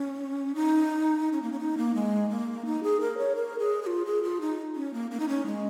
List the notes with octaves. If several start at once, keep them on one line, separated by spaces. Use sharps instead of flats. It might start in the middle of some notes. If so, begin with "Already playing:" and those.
Already playing: C#4
D#4
C#4
A#3
C#4
D#4
A#3
G#3
A#3
D#4
G#4
A#4
C#5
A#4
G#4
G#4
F4
G#4
F4
D#4
C#4
A#3
A#3
D#4
C#4
G#3